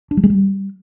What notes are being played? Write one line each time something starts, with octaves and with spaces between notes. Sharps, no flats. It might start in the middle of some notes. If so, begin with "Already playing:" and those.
D4
G3
G#3
G3